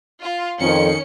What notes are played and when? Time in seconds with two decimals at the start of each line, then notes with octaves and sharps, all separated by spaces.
0.22 F4
0.61 F2 D#3 C#4 C#7